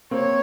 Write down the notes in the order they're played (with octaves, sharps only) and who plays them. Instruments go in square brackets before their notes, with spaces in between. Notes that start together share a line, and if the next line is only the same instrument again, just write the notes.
[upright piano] A#3 C4 [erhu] C#5